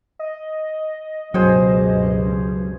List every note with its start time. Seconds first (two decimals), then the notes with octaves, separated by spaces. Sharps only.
0.19 D#5
1.34 C#2 G2 B2 F#3 G#4 C5